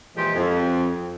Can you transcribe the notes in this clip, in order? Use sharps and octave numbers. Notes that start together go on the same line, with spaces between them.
A#2 E3 F3 G#3 G4 C5
F2